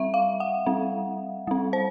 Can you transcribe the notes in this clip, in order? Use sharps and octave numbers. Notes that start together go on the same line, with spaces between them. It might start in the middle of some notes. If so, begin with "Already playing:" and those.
Already playing: G3 C4 E5
F5
F#5
G3 C4
G3 C4
C5